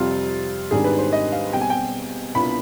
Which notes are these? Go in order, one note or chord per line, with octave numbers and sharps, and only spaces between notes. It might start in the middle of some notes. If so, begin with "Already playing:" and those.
Already playing: F2 C3 G3 C4 F4
G#1 G#2 D#3 G3 D4 G#4
B4
C5
D#5
F5
B2 G3 C4 G4 G5
G#5
G5
C2 B2 B3 D4 F4 B5